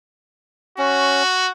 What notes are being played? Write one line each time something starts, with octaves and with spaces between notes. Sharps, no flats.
C#4 F#4